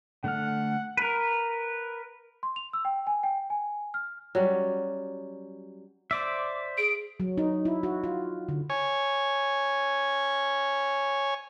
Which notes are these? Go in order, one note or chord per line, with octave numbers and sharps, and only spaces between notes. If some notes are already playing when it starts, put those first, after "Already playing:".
D3 A3 F#5 F6
A#4 B4
C6
F7
E6
G5
G#5
G5
G#5
F6
F#3 G3 C#4
C5 D5 E5 D6
G#4 D7
F#3
D#4
E4
F#4
F4
D3
C#5 G#5